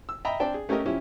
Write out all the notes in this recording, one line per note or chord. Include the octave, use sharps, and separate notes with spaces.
E6
D#5 E5 G5 A#5 B5
C4 D4 D5 G5 A5
G#4
A3 C#4 G4 A#4 D#5
F3 C#4 E4 G4